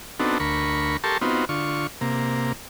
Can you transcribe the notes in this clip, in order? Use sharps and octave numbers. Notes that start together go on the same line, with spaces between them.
B3 C4 D4 D#4 F#4 A4
D2 A#4 B5 C#6
G4 A4 A#4 A5 C6 C#6
B3 C4 D#4 F4 F#4
D3 F4 C#6
C3 A#3